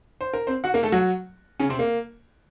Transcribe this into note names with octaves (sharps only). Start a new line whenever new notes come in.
C5
A#4
C4 C5
F#4 F#5
A#3 A#4
A3 A4
F#3 F#4
C#3 C#4
C3 C4
A#3